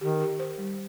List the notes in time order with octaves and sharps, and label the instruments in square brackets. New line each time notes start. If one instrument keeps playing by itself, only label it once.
[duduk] D#3 [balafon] G4
[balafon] G4
C5
G3